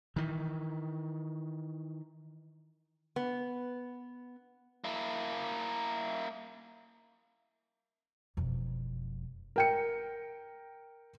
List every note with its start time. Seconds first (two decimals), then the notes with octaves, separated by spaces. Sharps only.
0.16 D#3 E3
3.16 B3
4.84 A#3 E4
8.37 E1 F2
9.56 A#4 G5 C#7